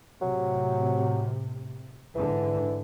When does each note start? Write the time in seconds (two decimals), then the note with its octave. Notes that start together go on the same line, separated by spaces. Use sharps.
0.22 A2 C3 F#3
2.15 G#2 D3 E3